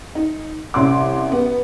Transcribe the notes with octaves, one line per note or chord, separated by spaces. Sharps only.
D#4
C2 C#4 C6 D6
B3